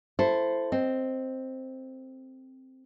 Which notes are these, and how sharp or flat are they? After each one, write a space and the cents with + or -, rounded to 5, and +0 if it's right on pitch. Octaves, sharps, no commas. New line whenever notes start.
E4 +20 A4 +0 C5 +0
C4 +0 D#5 +0